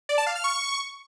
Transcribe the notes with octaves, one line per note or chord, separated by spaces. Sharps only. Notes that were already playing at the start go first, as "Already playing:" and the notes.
D5
A5
F5
F6
C#6